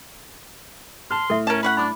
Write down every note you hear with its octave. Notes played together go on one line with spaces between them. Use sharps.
A5 C6 F6
A2 A4 E5
C#4 A#4 A5
C#4 C#5 F#5 B5
D4 B5 D6